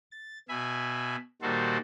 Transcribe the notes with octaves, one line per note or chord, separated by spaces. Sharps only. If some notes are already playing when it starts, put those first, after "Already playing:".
A6
B2 E5 G#5 B5
A#2 D#3 G3 F#4 A4 C5